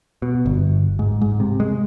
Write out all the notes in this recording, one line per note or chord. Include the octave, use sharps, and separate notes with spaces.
B2
G1
G#2
G#2
C3
G#3